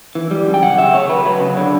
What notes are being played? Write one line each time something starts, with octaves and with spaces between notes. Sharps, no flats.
E3
G3
F#2
G5
C#3 F#5
C#3 E5
A3 C#5
F#3 B4
F#3
C#3
D3